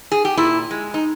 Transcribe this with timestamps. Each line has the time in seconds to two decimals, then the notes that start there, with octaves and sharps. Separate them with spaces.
0.12 G#4
0.25 G4
0.37 A#2 E4
0.71 G#3
0.94 D#4